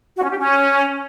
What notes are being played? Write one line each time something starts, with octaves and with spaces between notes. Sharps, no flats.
F#4
C#4
G4
C#4